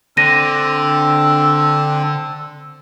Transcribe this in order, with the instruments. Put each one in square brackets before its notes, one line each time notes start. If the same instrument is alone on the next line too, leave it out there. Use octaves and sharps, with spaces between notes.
[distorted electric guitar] D3 [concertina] C4 D4 A4 [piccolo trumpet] E6 [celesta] A#6 D#7